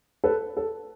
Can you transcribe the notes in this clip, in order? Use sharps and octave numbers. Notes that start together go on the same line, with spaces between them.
A4 B4
A4